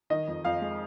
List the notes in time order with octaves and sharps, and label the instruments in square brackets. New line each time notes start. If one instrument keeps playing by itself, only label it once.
[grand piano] D#3 D#5
F2
F2 F5
G#3